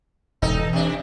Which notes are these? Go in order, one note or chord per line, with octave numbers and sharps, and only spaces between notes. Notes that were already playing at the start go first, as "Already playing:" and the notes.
E1 G#2 D#4 A4
E3
C3 D4